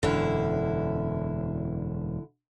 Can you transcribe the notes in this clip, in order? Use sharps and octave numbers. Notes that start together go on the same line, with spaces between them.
E1 F#2 D3 E4